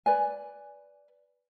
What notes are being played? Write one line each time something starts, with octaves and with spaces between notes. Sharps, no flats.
B4 D5 G#5